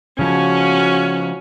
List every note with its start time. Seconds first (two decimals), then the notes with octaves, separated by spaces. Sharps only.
0.19 C#3 F3 C#4 F#4